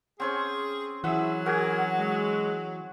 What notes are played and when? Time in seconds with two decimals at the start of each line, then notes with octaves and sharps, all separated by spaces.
0.20 C4 C#4 G#4 C5
1.04 E3 F#3 E4 G#4 E5 F#5
1.46 F#4 G#4 A#4 G#5
1.98 G#3